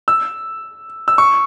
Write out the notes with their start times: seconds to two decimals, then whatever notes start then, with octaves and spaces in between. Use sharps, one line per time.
0.08 E6
1.08 E6
1.18 C#6